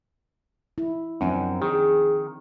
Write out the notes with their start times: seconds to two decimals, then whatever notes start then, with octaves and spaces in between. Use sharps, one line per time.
0.78 E4
1.21 F#2 F3 C4 D4
1.62 D#3 G#4